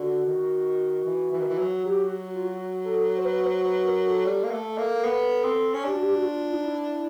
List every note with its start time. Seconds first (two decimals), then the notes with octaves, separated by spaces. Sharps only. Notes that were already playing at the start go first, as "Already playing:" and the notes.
Already playing: D3 F#4
0.25 D#3
1.05 E3
1.32 E3
1.39 D#3
1.48 E3
1.59 F#3
1.85 F#3 G4
2.05 F#4
2.34 F4
2.45 F#4
2.85 A4
3.16 C5
3.25 B4
3.44 C5
3.65 B4
3.85 A#4
4.05 A4
4.25 G3
4.44 A#3
4.51 A3
4.78 A#3
5.05 B3
5.44 C4
5.74 C#4
5.84 D4 G4
5.93 F#4
6.02 G4
6.14 F#4
6.24 F4
6.53 D#4
6.65 E4